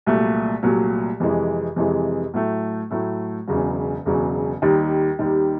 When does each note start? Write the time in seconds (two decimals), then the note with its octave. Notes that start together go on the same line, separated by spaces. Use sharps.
0.06 C2 A#2 F#3 A3
0.62 C2 A#2 F#3 A3
1.20 F2 C3 E3 G#3
1.76 F2 C3 E3 G#3
2.34 A2 F#3 A3
2.91 A2 F#3 A3
3.47 E1 E2 C#3 F#3
4.05 E1 E2 C#3 F#3
4.62 D#2 D#3 G3
5.19 D#2 D#3 G3